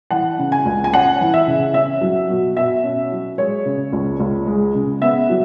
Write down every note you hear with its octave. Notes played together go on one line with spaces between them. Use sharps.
E3 F#5
C#3
G#5
C#2
G#5
C#4 F#5
E3
E5
C#3
C#4 E5
F#3
B2
B2 E5
C#4
F#3
G#3 C#5
C#3
C#2
C#2
G#3
C#3
B3 E5
F#3